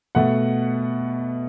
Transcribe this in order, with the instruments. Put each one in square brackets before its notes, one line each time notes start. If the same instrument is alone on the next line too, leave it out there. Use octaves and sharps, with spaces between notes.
[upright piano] B2 A3 F#5